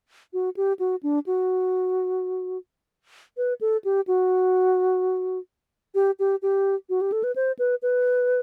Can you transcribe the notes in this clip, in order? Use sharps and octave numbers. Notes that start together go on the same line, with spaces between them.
F#4
G4
F#4
D4
F#4
B4
A4
G4
F#4
G4
G4
G4
F#4
G4
A4
B4
C5
B4
B4